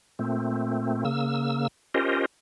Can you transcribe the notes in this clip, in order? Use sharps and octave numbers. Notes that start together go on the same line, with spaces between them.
A#2 A3 C4
C#3 A#3 E6
C#4 F4 G4 A#4 C5 D#5